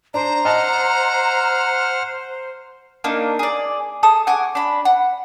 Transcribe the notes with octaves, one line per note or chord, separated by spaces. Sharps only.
D4 C5 A#5
D#5 F#5 A5 F6
A#3 D4 D#4
G#4 D5
G#4 A4 A5 D#6
F#5 G#5 C#6 D6
D4 B5
F#5